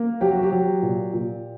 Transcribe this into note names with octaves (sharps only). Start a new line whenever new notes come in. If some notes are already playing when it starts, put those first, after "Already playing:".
Already playing: A#3
F#3 G4
F#4
G4
F#3
A#2
A#2